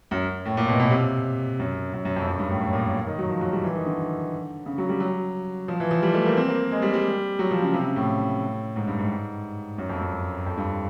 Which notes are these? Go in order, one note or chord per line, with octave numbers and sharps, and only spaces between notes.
F#2
A2
A#2
B2
B2
C3
F#2
F#2
F#2
F2
F#2
G2
A2
A2
A#2
D#3
F#3
F3
F#3
G3
E3
D#3
D3
C#3
F#3
G3
F#3
F3
E3
F3
G3
A3
A#3
C4
A#3
G#3
G3
G3
F#3
F3
C#3
C3
C#3
A2
G#2
G2
G#2
F#2
F2
F#2
F2
G2